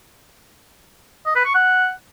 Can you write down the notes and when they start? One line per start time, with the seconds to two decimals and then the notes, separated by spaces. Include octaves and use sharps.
1.26 D#5
1.36 B4
1.45 C#6
1.55 F#5